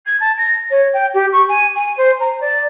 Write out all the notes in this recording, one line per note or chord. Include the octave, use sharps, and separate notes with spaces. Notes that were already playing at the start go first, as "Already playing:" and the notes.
G#6
A5
A#6
C#5
G5
G4
C#6
G#5
G#5
C5
A#5
D5